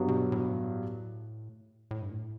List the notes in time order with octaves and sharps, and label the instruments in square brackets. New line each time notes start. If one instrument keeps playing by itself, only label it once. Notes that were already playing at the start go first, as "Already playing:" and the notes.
Already playing: [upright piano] G2 F#3 B3
[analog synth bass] B2
A2
B2
A2
A2
G2
A2